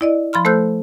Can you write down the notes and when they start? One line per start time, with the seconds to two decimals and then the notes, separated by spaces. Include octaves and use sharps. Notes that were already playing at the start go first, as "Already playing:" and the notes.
0.01 E4 D5 D#5
0.33 F3 B5 C6 F6
0.45 A3 A4 C5 E6 F#6 G6